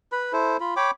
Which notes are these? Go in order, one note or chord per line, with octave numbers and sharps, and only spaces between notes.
B4 B5
E4 A4 C5
F4 B5
C#5 G5 B5 D6